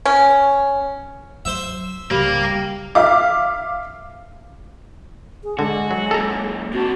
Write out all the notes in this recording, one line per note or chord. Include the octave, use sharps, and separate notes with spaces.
C#4
F#3 C5 E5
C#2 C#3 G3 A#3
E5 F5 D6
G#4
D3 G#3 F#4
F#3
F#2 A#2 A4 A#5
C3 D4 F#4